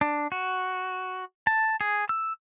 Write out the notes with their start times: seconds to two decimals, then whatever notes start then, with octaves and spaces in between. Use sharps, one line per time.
0.01 D4
0.32 F#4
1.47 A5
1.81 G#4
2.09 E6